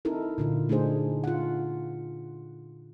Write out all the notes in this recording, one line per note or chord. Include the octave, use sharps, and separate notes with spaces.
C4 D#4 E4 A4 A#4
A#2 D3 F4
A3 D4 D#4 G#4 C5
F4 F#5